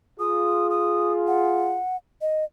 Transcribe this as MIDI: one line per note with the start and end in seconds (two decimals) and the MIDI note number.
0.20 1.79 65
0.20 1.79 68
0.20 0.67 87
0.70 1.12 87
1.27 1.96 78
2.21 2.45 75